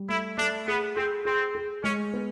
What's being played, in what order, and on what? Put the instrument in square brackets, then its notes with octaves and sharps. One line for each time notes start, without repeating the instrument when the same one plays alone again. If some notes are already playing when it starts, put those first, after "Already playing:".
Already playing: [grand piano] G3
[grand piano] A3 [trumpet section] E4
[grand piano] A3 [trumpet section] D4
[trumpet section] B3 [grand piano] G#4
[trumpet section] C4 [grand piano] G#4
[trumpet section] C4 [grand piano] G#4
[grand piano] G#4
[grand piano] G#3 [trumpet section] C#4
[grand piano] B3